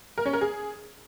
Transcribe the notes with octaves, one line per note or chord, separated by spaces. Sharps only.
A#4
C#4
A#4
G#4